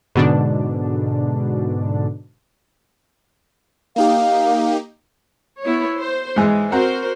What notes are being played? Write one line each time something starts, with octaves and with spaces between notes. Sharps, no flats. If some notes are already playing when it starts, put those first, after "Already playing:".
G#2 B2 D3 D4
A#3 D#4 G4 F5
B3 E4 C#5
C5
G#2 E3 G#3
C4 F#4 A#4 C5 F#5 A#5